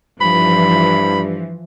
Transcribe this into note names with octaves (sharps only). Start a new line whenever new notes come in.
G2 E3 F3 B5